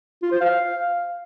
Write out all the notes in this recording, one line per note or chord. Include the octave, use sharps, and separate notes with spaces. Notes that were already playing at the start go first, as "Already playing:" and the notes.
F4
C5
F5